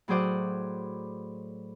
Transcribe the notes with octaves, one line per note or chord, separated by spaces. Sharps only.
A2 F#3 G#4 C5 D5 F#5